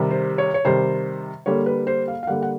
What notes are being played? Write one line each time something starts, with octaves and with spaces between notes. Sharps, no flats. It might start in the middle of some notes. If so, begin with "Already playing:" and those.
Already playing: C3 D#3 G3
C5
C#5
C#5
C3 D#3 G3 C5
D3 G3 A#3 C#5
B4
C5
F5
F5
D3 G3 A#3 F#5
F#5